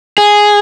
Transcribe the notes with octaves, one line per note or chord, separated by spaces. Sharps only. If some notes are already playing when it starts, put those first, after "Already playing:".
G#4